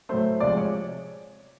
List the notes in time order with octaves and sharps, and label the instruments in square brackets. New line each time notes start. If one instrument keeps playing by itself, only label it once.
[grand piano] A2 F#3 A3 C5
C3 F3 G#3 D5
C#5